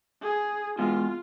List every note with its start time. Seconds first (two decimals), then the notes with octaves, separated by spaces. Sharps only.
0.22 G#4
0.79 E2 G#3 F4